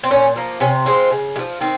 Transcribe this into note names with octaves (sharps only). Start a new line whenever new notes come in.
C4
A#2 C#4
F3 A#3
C3 C#4
F3 G#3 C4
C#3
G#3
F3
D#3 C4